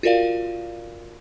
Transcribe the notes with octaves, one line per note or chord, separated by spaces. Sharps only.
F4 F#4 A#4 D5 F5